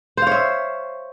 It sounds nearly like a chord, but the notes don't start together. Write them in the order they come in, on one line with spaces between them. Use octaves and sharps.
C5 F5 C#5 E5